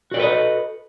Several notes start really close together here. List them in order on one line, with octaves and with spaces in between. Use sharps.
F#4 D5 A4 B4 D#5